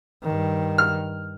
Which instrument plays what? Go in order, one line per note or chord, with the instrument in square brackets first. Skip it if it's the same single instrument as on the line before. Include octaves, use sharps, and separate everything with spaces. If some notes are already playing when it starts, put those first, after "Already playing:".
[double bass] G2 D#3
[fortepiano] F6